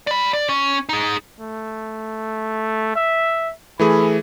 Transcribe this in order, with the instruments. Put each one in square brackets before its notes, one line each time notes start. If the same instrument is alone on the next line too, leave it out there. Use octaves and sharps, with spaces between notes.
[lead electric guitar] D5 B5
D5
C#4
D#4 G#4
[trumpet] A3
E5
[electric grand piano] E3 A3 G#4 [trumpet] B5